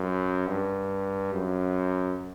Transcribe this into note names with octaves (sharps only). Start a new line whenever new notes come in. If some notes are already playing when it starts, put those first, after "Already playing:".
Already playing: F#2
G2
F#2